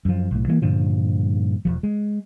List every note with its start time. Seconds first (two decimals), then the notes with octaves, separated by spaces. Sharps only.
0.05 F#2 F3
0.31 B1 A2
0.48 E3 G#3 A#3
0.62 G2 A#2 D3 F3
1.65 E1 D#2 F3
1.83 G#3